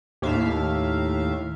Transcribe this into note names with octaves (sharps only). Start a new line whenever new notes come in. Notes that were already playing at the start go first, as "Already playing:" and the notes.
D#2 A2 E5 F5